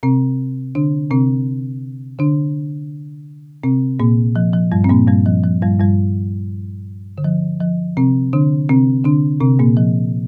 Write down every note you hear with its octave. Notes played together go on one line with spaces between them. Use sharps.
C3 C4
D3 D4
C3 C4
D3 D4
C3 C4
A#2 A#3
F3
F3
G2 G3
C4
A#2 A#3
G2 G3
F3
F3
G2 G3
G2 G3
D3
F3
F3
C3 C4
D3 D4
C3 C4
D3 D4
C3 C4
A#2 A#3
F3